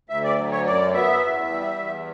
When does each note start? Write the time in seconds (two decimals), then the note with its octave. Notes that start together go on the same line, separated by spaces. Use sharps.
0.09 D2 E5
0.24 D5
0.38 F#3
0.51 C#5
0.66 F#2 D5
0.94 B3 E5
1.22 E2
1.50 G3
1.78 E2